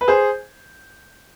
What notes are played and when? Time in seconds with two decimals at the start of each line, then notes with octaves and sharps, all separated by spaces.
0.01 B4
0.08 G#4 C5